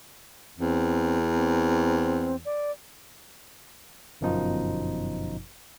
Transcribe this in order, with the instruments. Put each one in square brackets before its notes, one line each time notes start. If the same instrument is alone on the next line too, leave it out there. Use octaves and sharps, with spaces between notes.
[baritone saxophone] E2 [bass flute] C4
[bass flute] C4
D5
[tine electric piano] G1 F#2 B2 F3 D#4 F4